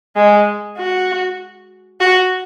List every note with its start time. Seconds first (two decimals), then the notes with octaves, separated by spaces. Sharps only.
0.16 G#3
0.78 F#4
2.00 F#4